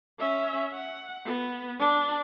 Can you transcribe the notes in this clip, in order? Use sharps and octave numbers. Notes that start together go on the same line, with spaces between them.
C#4 E5
F#5
B3
D4